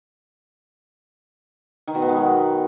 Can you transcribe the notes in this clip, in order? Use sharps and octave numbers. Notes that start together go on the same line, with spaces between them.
D#3
B2
B3
G#3
F#3